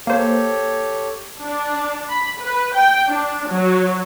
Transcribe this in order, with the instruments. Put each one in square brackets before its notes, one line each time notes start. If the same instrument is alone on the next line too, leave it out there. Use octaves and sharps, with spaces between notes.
[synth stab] A#3 C5 [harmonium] G4 A4 C#5
[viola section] D4
B5
B4
G5
D4
F#3